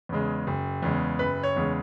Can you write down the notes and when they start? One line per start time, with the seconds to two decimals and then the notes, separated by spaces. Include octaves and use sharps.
0.09 E2 C#3 G#3
0.47 F#1
0.83 E2 C#3 G#3
1.19 F#1 B4
1.43 C#5
1.56 E2 C#3 G#3